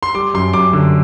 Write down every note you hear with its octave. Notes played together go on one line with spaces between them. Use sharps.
C6
G3 D6
F#2 C6
F#2 D6
D3